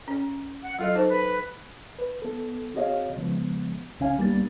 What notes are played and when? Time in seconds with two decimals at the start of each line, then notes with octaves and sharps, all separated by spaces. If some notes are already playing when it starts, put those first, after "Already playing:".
0.08 C#4
0.63 F#5
0.79 F#3 F4 A4 D#5
0.95 D#4 A4 C5 A5
1.09 B4
1.99 B4
2.22 B3 A4
2.75 C4 F#4 G#4 C#5 D#5 F5
3.17 C#3 F3 G#3 B3
4.00 C2 C#3 C#4 F5 G#5
4.18 C2 G3 A#3 B3 D4 A6